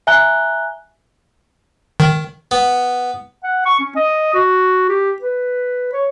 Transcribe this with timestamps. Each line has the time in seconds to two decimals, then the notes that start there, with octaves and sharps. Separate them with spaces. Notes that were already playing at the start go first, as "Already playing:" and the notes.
0.07 E5 G#5 A#5 F#6 G7
2.00 D#3
2.51 B3
3.44 F#5
3.66 C#6
3.80 C#4
3.96 D#5
4.34 F#4
4.89 G4
5.22 B4
5.93 C#5